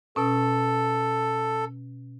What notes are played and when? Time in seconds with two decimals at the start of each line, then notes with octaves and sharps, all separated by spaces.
0.16 B2 C#4 A4